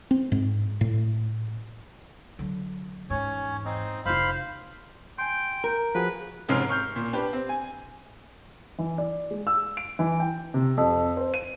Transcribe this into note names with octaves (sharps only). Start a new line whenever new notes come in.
C4
G#2
A2
D3 F#3
E2 G#2 C#4 C#5
C4 D#4
F1 F4 C5 F5 B5
G5 G#5 C6
A#4
F3 F#4 G#4 B4
F1 G#2 C3 C#4 F6 C7
C#6 F6 G6
A#2
D4 G4 B4
C4
G#5
E3
D5
G#3
E6
D7
E3
G5
C3
F2
C5
D#7